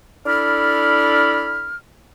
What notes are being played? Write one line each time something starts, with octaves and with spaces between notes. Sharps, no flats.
D4 E4 A4 B5 F6